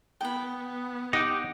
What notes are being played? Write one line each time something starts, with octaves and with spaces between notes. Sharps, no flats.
B3 G5 B5
D#4 G4 F#5 D6